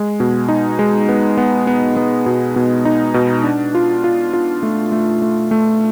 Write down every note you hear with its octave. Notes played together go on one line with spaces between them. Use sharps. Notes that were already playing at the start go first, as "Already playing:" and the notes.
Already playing: G#3
B2
D#4
G#3
B3
B3
B3
B3
B2
B2
D#4
B2
D4
F4
F4
F4
A3
A3
A3
A3